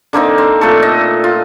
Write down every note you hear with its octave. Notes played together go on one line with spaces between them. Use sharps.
D3 A#3 C4 D#4
C4
A#2 A3 A4
D#5
F4